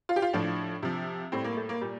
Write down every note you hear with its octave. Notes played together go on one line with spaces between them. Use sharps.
F4
G4
F4
A2 F3 D4
C3 F3
A2 G3 C4
A#3
A3
A#3
A#2 G3